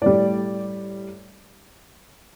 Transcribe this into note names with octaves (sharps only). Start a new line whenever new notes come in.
A2 G3 D5